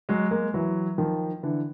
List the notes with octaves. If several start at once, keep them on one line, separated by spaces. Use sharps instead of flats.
F#3 G#3
G#3 A#3
E3 F#3
D#3 F3
D3 E3